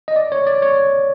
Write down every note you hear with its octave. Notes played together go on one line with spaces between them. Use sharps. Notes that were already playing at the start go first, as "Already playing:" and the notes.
D#5
D5
C#5
D5
C#5